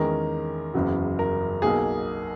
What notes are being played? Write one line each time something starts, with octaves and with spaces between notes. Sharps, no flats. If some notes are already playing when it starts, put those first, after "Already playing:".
Already playing: E2 D#3 G#3 C#4 A#4
F#1 E2 C#3 F#3
A#4
B1 B2 A#3 G#4